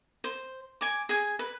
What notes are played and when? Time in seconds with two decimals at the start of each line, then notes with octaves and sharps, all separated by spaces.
0.24 C5
0.81 G#5 D6
1.09 G#4 G#5
1.39 B4